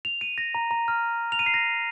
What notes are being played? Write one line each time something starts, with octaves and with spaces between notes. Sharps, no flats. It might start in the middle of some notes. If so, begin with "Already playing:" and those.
F7
D#7
A#6
A#5
A#5
F6
F7
D#7
C7
A#6